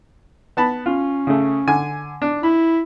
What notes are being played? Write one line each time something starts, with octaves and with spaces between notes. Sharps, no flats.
B3 A5 B5
C#4 F4
C#3 A3
D3 G#5
D4
E4 B5